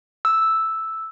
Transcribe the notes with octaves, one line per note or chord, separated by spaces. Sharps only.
E6